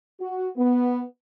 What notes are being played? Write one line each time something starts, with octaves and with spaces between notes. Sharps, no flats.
F#4
B3